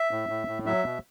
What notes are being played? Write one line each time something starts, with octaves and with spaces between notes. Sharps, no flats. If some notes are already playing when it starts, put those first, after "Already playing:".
Already playing: E5
A2
A2
A2
F#3 E5
B2